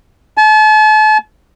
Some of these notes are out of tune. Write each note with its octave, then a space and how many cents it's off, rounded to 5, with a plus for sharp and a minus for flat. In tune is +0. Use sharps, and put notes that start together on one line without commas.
A5 -40